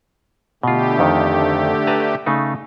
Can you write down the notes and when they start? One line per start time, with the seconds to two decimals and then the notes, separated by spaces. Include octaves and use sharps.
0.63 B2 D3 A3 F4 G4
0.99 F2 D#3
1.87 B4 A5 A#5
2.26 C#3 A3 D#4